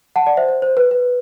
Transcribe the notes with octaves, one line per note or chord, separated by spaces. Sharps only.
F#5 A5
D5 F#5
C5 E5
C5
C5
B4
B4